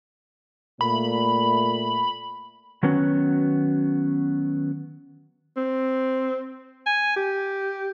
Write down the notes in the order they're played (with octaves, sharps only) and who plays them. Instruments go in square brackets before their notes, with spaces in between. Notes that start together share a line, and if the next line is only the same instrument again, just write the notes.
[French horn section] A#2 A3 [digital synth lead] B5
[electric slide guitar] D#3 F#3 B3 C#4 F#4
[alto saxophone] C4
G#5
G4